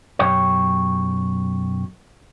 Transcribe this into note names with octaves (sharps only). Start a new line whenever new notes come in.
B1 F#2 G4 C#5